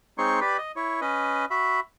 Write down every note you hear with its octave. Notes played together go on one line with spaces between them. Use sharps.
G#3 C4 D#4 C#5 C6 C#6
G4 B4 D5 B5
D#5
E4 C#5
C#4 B4 D#5
F#4 E5 B5